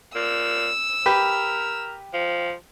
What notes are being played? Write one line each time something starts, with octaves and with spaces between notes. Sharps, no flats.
A#2 E6
G4 A#4 B4
F3